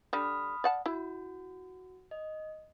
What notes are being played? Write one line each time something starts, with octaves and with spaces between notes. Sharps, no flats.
D3 G3 B5 D#6 F6
D5 F#5 A5
E4 F#4
D#5